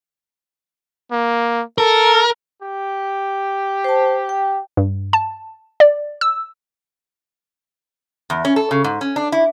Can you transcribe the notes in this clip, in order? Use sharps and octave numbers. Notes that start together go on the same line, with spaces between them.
A#3
A4 A#4
G4
C5 A5
G5
G2
A5
D5
E6
E2
C#4
A4
C#3
G#2
C#4
D4
E4